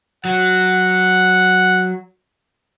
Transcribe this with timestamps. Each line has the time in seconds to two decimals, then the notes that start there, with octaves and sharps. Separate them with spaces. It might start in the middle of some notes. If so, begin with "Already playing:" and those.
0.25 F#3 F#5